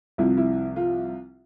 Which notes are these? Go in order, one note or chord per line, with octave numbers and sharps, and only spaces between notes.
C2 C3 F3 E4
E4
F4